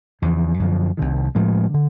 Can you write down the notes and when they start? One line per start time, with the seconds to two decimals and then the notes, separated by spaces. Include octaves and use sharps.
0.22 E2 C#3 F3
0.60 F#2 D3 F3
0.97 C2 C3 D#3
1.35 A2 F3 G#3
1.74 D3